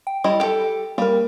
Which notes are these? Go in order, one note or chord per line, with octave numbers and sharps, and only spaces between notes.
G5
G3 E4 D#5
G4 A4
G3 A#3 A#4